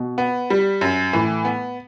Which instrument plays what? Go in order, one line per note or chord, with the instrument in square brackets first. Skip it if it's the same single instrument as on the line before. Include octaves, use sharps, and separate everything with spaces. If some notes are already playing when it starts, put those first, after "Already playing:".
Already playing: [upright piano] B2
[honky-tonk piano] B3
G3
F#2
[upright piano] A2 [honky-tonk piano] E3
[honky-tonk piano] B3